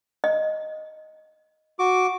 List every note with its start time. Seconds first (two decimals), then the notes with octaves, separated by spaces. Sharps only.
0.24 D#5
1.79 F#4 D6